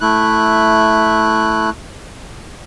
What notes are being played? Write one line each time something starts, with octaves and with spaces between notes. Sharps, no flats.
A3 E4 F#6